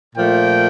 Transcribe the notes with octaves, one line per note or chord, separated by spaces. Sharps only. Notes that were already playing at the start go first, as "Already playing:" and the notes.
A#2 F3 A3 G5